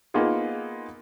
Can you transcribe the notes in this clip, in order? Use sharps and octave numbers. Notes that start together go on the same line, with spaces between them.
A#3 B3 D#4 F4 G#4 B4